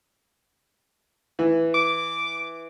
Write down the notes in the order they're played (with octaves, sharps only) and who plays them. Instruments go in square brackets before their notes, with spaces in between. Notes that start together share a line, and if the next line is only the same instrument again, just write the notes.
[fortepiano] E3
[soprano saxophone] D6